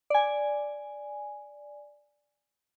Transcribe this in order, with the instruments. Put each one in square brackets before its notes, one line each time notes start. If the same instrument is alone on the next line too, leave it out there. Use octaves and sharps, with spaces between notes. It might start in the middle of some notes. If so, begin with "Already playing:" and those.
[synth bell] D5 G#5